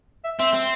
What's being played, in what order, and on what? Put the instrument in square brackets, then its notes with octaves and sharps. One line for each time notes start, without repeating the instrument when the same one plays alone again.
[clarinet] E5
[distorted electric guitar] C4 [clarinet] E5
[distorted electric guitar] C4